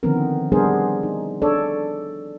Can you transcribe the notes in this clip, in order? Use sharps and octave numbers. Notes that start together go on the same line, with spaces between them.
D3 D#3 F3 B3 C4 A#4
G3 B3 D4 G#4 A#4 C5
D#4
D4 A4 C#5 D5